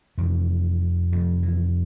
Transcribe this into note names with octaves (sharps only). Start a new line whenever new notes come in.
F2 C3 E3
F2 C3 F3
E3